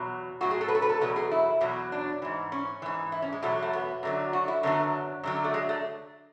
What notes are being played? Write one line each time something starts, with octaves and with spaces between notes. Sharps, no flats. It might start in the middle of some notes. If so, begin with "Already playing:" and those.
Already playing: E2 B2 F#3
A2 F#3 F#4
G#4
A4
B4
A4
B4
A4
E2 B2 F#3 B4
G#4
E4
E2 B2 F#3
D4
G#2 E3
C#4
G#2 E3
E4
C#4
G#3
E2 B2 F#3 A3
A3
B3
F#2 D3 F#3
F#4
E4
F#2 D3 F#3 B3
F#2 D3 F#3
A3
G#3
A3